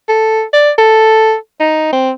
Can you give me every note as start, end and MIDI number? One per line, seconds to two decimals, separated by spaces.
0.09 0.43 69
0.53 0.71 74
0.78 1.35 69
1.60 1.89 63
1.93 2.11 60